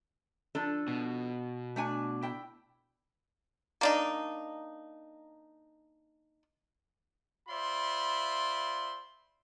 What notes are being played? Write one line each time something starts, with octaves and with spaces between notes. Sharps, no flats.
F3 D4 A4
B2
A3 D4 G#5
E4 G5
A#3 D4 D#4
F4 C5 D5 E5 B5 C6